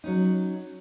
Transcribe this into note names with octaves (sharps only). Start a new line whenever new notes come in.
F#3 C#4 D#4